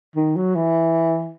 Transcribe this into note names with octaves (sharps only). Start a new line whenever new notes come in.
D#3
F#3
E3